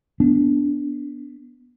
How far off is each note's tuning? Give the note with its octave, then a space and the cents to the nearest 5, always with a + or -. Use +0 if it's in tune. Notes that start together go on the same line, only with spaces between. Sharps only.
B3 +0 D4 -15